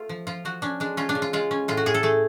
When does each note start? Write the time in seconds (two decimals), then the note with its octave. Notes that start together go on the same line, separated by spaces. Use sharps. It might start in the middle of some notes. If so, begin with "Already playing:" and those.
Already playing: A3 F4
0.09 F3
0.27 F3 F4
0.45 F3 F#4
0.62 C#4 D4
0.80 G#3 D4
0.97 C#4 F4
1.09 D4
1.15 C#3
1.22 F4
1.33 G#3 F4
1.51 C#4
1.68 A2 F4
1.77 F#4
1.86 A2 G#4
1.94 A4
2.03 A3 G#4